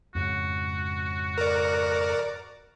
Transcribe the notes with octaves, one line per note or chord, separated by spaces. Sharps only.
F2 G#2 C#3 F#4
A#4 D5